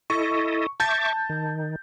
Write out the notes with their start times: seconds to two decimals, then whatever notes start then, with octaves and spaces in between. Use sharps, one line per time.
0.10 E4 A4 D#5 C#6
0.80 E5 A5 C#6 D6 G6 A6
1.29 D#3